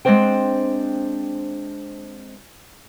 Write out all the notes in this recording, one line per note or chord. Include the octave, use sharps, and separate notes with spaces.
G#3 A#3 C4 D4 C5 G5